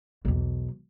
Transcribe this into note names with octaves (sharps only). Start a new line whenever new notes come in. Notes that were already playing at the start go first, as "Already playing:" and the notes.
B1 E2